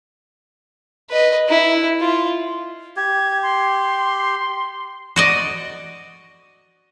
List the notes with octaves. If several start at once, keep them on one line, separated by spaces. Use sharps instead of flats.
B4 D#5
E4
F4
G4 G#6
C6
F#4 D5 D#5